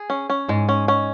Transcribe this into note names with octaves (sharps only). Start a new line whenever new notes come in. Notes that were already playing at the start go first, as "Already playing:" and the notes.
Already playing: G#4
C#4
C#4
G#2 G#3
C#4
C#4